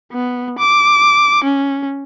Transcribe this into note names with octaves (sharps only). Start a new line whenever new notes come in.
B3
D6
C#4